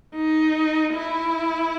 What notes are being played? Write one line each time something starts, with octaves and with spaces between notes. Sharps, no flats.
D#4
E4